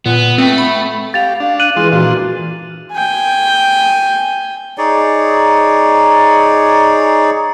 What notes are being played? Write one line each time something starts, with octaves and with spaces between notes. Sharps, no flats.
A#2 B3
A3 C4
B5
G4 F5 A6 F7
D4 F5
F#6 D#7 F#7
E3 G#3 F4 G#4 C6
A#2 D4 F4 F#4
G5 G#5
D#4 G#4 C#5 D5